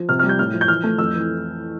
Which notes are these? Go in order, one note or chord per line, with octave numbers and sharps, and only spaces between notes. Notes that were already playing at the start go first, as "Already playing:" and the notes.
Already playing: F3
C3 F6
F6
G3
G6
A2 F6
F3
G6
E3 F6
A3
F2 E6
E3